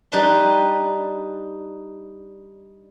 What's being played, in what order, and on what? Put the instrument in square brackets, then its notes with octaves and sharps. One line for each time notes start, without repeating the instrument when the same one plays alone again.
[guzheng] G3 D4 D#4 B4 A5 C6